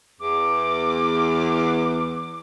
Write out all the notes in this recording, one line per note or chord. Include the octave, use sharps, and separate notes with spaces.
E2 D6